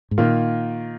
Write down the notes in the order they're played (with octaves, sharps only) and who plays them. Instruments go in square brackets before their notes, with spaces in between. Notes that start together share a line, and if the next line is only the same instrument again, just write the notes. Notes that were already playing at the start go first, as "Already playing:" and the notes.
[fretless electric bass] G#2
[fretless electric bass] A#2 [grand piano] D#3 A#3 F4